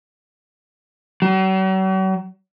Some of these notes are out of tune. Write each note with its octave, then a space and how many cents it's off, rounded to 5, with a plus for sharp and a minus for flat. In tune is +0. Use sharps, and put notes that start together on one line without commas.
F#3 +45